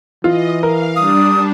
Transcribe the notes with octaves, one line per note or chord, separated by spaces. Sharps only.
E3 F4 D#5
A#4 F5
G3 D4 D#6